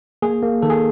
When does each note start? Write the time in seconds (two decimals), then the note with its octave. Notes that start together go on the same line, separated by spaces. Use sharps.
0.22 A#3 G#4
0.43 A#3
0.62 D#3 A4
0.70 G#4